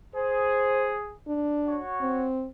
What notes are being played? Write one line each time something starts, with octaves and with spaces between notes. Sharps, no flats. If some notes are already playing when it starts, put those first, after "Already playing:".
G#4 C5
D4
F#4 C#5
C4